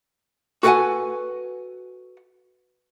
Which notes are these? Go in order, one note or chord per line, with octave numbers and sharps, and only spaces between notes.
F#4 A4 B4 F5 F#5 G#5